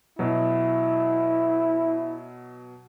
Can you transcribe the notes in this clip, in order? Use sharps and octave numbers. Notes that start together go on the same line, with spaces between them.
B2 F#3 E4